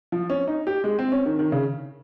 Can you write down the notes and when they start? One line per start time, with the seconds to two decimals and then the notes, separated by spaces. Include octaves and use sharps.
0.12 F3
0.30 C#4
0.47 D#4
0.67 G4
0.84 G#3
0.99 C4
1.12 C#4
1.26 D#3
1.39 D#3
1.52 C#3